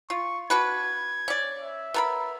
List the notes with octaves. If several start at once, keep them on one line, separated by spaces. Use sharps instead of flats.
F4 C#6
D4 F#4 B4 G#6
C#4 D5
E5
B3 A#4 B5